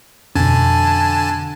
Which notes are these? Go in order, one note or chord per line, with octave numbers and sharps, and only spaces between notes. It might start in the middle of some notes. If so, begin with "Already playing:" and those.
F2 B2 D3 C4 C#4 G#5 A5